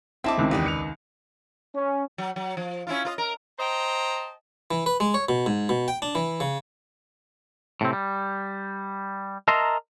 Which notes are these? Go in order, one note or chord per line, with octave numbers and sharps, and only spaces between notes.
C4 E4 D#5 E5 A5 D6
C#2 C3 D#3
E2 G4 B4 D5 D#5
C#7 F7
C#4
F#3
F#3
F3
C#4 E4 F4
F4 B4 D#5
A#4
C5 D#5 G5 A5 A#5
E3
B4
G#3
C#5
B2
G#2
B2
G5
D4
E3
C#3
A2 C3 C4
G3
A#4 D#5 E5 A5 A#5 C6